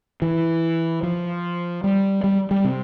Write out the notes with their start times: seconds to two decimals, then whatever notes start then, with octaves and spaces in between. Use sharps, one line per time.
0.22 E3
1.03 F3
1.84 G3
2.24 G3
2.51 G3
2.65 C3